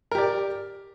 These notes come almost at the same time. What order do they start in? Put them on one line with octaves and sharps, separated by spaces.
A#4 G4 D5